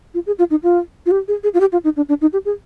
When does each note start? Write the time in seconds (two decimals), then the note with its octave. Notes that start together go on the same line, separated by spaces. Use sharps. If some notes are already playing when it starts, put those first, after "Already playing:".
0.14 F4
0.26 G#4
0.39 F4
0.50 D#4
0.63 F4
1.06 F4
1.11 G4
1.28 G#4
1.43 G#4
1.54 F4
1.60 G4
1.72 F4
1.84 D#4
1.96 D4
2.09 D4
2.21 D#4
2.33 G4
2.45 G#4